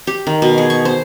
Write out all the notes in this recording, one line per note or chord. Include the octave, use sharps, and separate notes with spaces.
G4
D#3
B2
G#4
C#6
C5